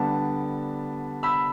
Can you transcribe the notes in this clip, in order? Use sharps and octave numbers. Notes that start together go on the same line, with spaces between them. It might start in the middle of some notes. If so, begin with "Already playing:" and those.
Already playing: D3 G3 B3 A5
B5 E6